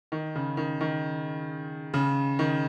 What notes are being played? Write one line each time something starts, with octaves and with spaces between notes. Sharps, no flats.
D#3
C#3
D#3
D#3
C#3
D#3